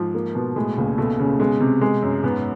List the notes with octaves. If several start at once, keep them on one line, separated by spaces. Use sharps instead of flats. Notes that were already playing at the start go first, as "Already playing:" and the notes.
Already playing: G#2 F3
A#3
B2
A2 G#3
C#2 A#2
B2 A3
A2 C#3
B2 G#3
C3
G#3
F#2
G#2 B3